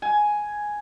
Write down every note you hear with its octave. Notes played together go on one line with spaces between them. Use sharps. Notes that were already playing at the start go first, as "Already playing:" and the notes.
G#5